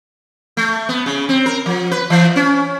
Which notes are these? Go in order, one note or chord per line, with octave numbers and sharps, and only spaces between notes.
A3
B3
C#3
C4
A#4
F3
B4
E3
C#4